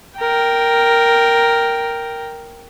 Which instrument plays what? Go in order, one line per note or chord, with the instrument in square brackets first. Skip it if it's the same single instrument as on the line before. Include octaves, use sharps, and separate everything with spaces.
[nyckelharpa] A#4 G5